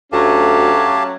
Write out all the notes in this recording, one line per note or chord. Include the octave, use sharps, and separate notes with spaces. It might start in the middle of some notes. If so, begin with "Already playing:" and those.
D2 F#3 A3 C#4 G4 F5 A5